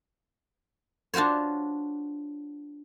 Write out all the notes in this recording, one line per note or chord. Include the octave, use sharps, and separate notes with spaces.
D4 F4 F#4 C5 C#5